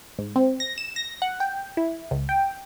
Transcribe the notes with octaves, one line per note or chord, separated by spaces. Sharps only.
G#2
C4
A#6
E7
A#6
F#5
G5
E4
C#2
G5